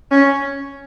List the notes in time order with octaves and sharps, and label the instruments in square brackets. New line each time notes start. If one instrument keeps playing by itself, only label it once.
[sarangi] C#4